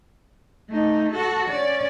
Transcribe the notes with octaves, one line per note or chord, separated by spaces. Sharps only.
A3 D#4
F#4 A4
C#4 D5